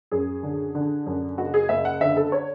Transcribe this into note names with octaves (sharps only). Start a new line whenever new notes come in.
F#2 G#4
D3
D3
F#2
F#1 F#4
G#4
F#1 E5
F#5
D3 E5
A4
C#5